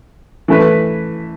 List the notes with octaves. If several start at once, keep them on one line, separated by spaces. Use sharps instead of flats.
E3 A3 E4 B4